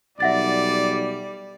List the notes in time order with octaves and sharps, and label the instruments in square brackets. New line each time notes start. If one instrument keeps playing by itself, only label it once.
[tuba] B1 [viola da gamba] G3 [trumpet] D5 [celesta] E5 F#5 A6